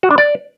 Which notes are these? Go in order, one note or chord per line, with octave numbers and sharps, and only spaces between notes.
F#4
D4
D5